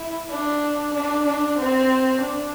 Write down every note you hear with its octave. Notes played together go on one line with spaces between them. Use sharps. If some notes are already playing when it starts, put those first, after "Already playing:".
Already playing: E4
D4
D4
D4
C4
D4